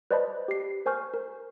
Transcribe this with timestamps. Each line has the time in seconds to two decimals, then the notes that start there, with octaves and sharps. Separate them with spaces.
0.11 B4 C5 D5 D#5 A5 B5
0.48 G4 C7
0.86 A#4 C5 G#5 C#6 F6 G6
1.14 A#4